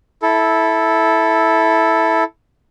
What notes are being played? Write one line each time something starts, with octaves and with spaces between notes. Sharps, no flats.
E4 A4